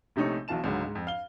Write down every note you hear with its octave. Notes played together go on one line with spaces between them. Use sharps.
A#1 C3 A3 D#4 C#5 C#6
B1 B2 E3 F5 A5 E7
C#2 G#2 D3 F#3
G#2
F2
F5 G7